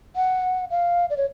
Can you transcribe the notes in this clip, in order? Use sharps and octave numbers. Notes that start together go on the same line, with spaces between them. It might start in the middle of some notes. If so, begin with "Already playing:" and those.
F#5
F5
D5
C#5